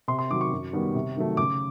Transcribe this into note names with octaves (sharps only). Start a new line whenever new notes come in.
C3 C6
C6
D#3 F#3 D6
C#6
F#2
D#3 G3 B3
C3
D#3 F#3 A3
C#3 D6